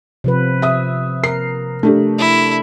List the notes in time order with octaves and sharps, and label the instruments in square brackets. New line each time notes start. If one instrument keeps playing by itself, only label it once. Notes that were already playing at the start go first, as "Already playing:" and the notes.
[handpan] C3 F3 B4
[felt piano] E5 D#6
[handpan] A#4 [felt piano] C7
[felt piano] A3 D4 G4
[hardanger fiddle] E4